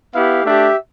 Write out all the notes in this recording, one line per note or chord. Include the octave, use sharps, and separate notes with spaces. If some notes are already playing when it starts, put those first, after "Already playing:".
B3 E4 G4 F5
A3 D4 G4 E5